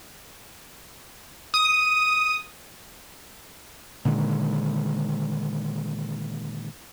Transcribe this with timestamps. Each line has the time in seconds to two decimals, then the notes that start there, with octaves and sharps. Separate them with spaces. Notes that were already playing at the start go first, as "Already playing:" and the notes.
1.54 D#6
4.05 A#2 D3 D#3 G#3